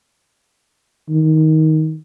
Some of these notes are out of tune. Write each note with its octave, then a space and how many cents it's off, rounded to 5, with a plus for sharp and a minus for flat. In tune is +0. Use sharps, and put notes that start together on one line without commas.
D#3 +15